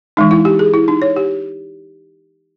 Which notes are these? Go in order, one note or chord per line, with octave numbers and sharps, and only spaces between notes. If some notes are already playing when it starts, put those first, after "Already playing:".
E3 G#3 D#4
E4
G4
G#4
E4
D#4
C#5
G4